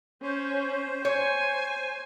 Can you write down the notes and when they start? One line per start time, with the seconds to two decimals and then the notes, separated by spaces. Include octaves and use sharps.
0.22 C#4 C5
1.05 C#5 G#5